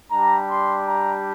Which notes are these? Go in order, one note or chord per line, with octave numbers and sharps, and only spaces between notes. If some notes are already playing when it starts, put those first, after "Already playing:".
G3 D4 G4 A#5
C6
A#5